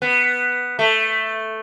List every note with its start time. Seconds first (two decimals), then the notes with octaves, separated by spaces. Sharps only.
0.02 B3
0.79 A3